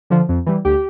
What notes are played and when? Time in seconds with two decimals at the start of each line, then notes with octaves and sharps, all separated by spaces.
0.10 D3 F3
0.29 F2
0.46 E3 G3
0.65 D2 G4